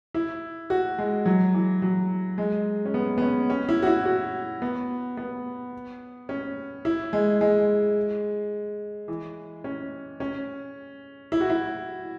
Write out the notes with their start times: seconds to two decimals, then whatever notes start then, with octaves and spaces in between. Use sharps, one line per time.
0.14 E4
0.70 F#4
0.98 G#3
1.26 F#3
1.54 E3
1.82 F#3
2.38 G#3
2.85 C#4
2.94 B3
3.18 B3
3.22 C#4
3.50 C#4
3.69 E4
3.83 F#4
3.87 E4
4.06 F#4
4.62 B3
5.17 B3
6.29 C#4
6.85 E4
7.13 G#3
7.41 G#3
9.08 E3
9.64 C#4
10.20 C#4
11.32 E4
11.40 F#4
11.50 E4